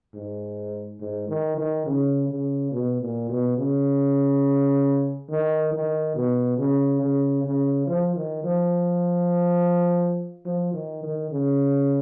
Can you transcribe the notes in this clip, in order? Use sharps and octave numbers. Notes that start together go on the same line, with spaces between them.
G#2
G#2
D#3
D#3
C#3
C#3
B2
A#2
B2
C#3
D#3
D#3
B2
C#3
C#3
C#3
F3
D#3
F3
F3
D#3
D#3
C#3